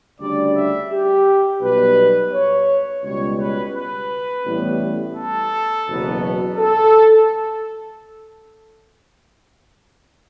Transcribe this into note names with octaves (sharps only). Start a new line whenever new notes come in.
D2 C#3 G3 D4 D5
E5
G4
B1 B2 G3 B4
C#5
C#2 B2 G3 C#5
B4
B4
A1 A2 G3 B3
A4
F#1 E2 B2 F#3 B3
A4